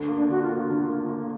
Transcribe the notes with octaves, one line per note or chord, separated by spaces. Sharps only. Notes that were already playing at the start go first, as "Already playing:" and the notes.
Already playing: D2
A#3
D4
D3 F#4
F4
A#3
D3
A#3
A#3